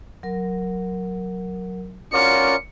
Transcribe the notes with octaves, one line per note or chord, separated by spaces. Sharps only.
F#3 A#4
C#4 F4 F#4 A#4 D5 C#7